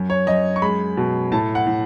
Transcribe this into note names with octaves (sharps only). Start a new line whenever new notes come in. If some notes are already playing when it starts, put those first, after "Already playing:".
Already playing: F#2
C#5
F#2 D#5
C#6
G#3 B5
B2
A2 A5
F#5
A2